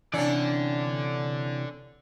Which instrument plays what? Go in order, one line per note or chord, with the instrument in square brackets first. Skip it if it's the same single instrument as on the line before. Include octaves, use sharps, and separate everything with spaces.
[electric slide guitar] C3 E3 [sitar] C#4 D4 [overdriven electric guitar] A4 D5